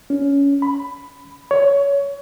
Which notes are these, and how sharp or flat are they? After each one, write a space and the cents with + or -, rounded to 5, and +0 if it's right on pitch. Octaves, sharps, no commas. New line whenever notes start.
C#4 +20
B5 +10
C#5 +20